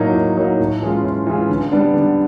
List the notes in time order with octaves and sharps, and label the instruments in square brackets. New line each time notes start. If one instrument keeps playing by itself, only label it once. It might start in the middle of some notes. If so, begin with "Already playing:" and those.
Already playing: [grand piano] A2 F#3 A#3 D#4
A2
F#3 A#3 D#4
A2
E3 G#3 C#4 F4
A2
E3 G#3 C#4 F4
D3
G3 B3 D4
D3